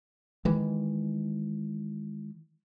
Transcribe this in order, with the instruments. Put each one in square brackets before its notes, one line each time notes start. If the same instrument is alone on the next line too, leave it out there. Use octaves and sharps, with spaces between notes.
[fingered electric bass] D#3 E3 G#3